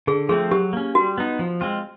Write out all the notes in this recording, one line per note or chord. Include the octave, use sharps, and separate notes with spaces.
D3 G#4
F3 A3 C4 G#4
F#3 G4
A#3 C#4
G3 F#4
B3 D#4
F3
G#3 C4 F4